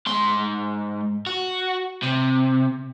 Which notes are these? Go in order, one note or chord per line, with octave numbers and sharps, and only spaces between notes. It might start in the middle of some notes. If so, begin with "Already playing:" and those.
G#2 C6
F#4
C3